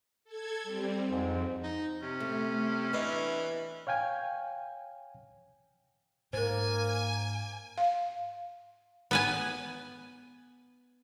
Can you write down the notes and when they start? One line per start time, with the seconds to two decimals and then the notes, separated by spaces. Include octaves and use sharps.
0.24 A4 G#6
0.63 G3 C4
1.07 F2 G#2 C4
1.63 D#4
2.02 C3 C#4
2.20 A3
2.93 E3 B3 D4 D#5
3.87 C#5 F5 G5 G#5
6.33 G#2 A#3 A#4 C5 G#5
7.78 F5
9.11 B3 B4 G#5